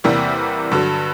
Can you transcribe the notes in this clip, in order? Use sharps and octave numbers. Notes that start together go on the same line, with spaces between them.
E2 C3 E3 G3 A#3
G2 D3 F#3